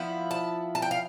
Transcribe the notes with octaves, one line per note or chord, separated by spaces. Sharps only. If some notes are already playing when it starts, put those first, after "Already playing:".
Already playing: F3 B3 E4
A5
A5
G5
F5